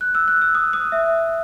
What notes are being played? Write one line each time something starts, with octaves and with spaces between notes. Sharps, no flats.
F#6
E6
F#6
E6
D#6
D#6
E5